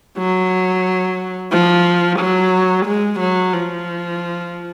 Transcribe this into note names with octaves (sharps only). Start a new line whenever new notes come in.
F#3
F3
F#3
G#3
F#3
F3